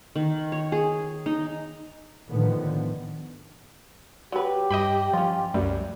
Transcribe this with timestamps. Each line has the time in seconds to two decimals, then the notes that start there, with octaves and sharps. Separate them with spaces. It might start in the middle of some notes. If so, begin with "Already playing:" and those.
0.16 D#3
0.52 C#5
0.72 G#4
1.26 D#4
2.30 A2 D3 D#3 F3 B3
4.32 F#3 G4 B4
4.71 G2 D#5 G5 B5
5.13 F3 C#4 F4
5.54 C2 F#2 G3 A3